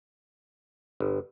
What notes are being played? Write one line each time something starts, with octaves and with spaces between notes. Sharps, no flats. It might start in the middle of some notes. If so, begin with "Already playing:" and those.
G1